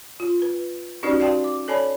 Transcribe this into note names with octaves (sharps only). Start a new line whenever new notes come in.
F4
B4
C#4 D#4 F#4 G4 B4 D5
F#4 D5 F5 G5 A5 C6
D6
A4 C#5 D5 G#5 A5 B5